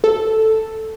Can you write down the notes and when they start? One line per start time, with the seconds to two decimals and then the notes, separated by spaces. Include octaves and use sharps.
0.04 A4